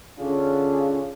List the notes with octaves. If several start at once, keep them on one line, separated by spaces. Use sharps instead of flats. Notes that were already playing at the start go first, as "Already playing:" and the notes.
D3 C#4 F4 G#4